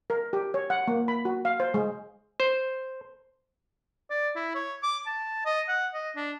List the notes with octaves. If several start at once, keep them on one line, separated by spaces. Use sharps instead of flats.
A#4
G4
C#5
F#5
A#3
B5
F#4
F5
C5
G#3
C5
D5
E4
C#5
D6
A5
D#5
F#5
D#5
D4